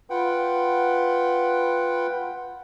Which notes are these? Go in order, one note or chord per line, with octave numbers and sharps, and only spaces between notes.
F4 B4 F#5 G5